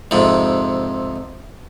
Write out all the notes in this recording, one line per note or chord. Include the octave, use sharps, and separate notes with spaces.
F2 G#2 C3